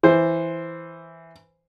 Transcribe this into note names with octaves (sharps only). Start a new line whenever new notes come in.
E3 C5